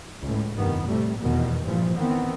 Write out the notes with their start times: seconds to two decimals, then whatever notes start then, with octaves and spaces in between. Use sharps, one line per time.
0.21 C#2 A2
0.55 F1 G2 D#3 B3
0.87 A2 C3 G3 A3
1.19 F1 E2 B2 D#3
1.64 G2 A#2 E3 F3
1.97 D#3 E3 B3 C4